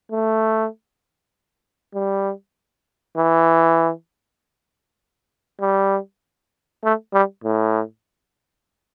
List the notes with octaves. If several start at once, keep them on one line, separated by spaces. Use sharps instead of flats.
A3
G3
E3
G3
A3
G3
A2